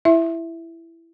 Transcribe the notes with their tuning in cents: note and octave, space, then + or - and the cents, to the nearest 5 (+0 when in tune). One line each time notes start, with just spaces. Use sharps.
E4 +10 E5 +0